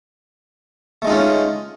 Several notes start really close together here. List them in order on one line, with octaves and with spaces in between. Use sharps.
A3 G#3 D#4 F4 C#4